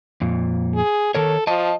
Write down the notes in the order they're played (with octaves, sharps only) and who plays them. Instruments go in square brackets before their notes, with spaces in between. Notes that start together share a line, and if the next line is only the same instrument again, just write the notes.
[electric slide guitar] F2 A#2
[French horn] G#4
[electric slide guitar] D#3 A#4 C#5 [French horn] A4
[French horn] F3 [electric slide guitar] D#5 A5